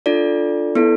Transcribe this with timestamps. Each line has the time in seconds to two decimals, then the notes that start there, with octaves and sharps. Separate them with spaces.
0.06 D4 F4 A4 D5
0.75 B3 E4 A4